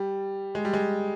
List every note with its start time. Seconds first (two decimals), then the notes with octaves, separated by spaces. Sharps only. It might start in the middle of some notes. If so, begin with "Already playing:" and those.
Already playing: G3
0.55 G#3
0.65 G3
0.73 G#3